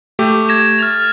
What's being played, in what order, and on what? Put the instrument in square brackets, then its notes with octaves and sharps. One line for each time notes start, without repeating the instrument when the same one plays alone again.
[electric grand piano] A3 G4
[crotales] G#6 A#6 E7
F6 A6 F7